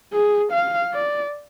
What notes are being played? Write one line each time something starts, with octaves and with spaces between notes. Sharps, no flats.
G#4
F5
D5